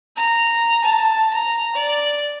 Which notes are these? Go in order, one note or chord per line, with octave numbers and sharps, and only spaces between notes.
A#5
A5
A#5
D5